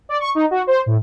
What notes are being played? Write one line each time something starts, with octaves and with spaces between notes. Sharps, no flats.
D5
C#6
D#4
F#4
C5
A2